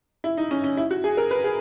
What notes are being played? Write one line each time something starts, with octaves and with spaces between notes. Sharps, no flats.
E4
D#4
C#4
C#4
E4
F#4
G#4
A#4
B4
G#4